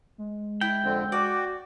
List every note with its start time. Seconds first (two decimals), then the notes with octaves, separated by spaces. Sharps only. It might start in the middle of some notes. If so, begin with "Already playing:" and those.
0.18 G#3
0.61 E4 G5
0.84 F2 D3 C4
1.12 F#4 D5